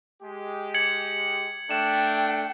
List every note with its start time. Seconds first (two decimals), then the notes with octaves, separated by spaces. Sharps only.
0.22 G#3 G4
0.74 G#6 C#7 F#7
1.71 A3 D4 G5 E7